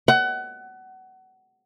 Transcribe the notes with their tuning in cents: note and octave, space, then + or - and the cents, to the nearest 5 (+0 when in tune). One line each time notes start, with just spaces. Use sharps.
F#5 +25